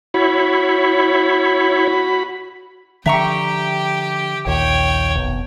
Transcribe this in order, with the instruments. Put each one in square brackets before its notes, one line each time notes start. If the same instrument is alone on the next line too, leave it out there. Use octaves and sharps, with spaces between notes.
[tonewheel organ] E4 C#5 [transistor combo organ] F#4 B5
[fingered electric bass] D3 F3 [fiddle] G4 G5 [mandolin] E5 A#5 C#6
[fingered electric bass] A#1 D#2 [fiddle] C#5 G5
[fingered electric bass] F1 B1